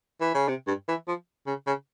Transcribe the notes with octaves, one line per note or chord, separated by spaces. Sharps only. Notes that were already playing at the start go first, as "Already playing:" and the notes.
E3
C#3
C3
G2
E3
F3
C#3
C#3